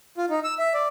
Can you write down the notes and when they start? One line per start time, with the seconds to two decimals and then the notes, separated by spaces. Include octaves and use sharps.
0.18 F4
0.30 D#4
0.44 E6
0.59 E5
0.74 D5